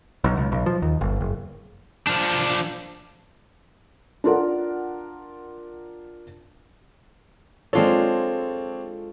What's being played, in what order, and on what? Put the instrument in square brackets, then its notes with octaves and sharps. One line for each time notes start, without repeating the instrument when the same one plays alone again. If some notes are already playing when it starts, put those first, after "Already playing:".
[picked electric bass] B1
C#2
B1
F3
D#2
G1
F#1
[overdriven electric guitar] F3 D4
[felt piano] D4 F4 A#4 F#5
[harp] G#3 F4 A4 [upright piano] C4 D4 C#5